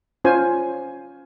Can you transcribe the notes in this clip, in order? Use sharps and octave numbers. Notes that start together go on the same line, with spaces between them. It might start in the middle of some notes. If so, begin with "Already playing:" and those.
C#4 F4 C5 G#5